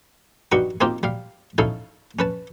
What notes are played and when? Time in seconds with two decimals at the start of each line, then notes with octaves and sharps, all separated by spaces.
0.52 G2 G3 D#4 F#4 C#6
0.81 A#3 C4 D#4 F4 G4 A#4
1.03 G3 F5
1.58 C#4 D#4 E4 A4 F5
2.19 C#4 B4 A5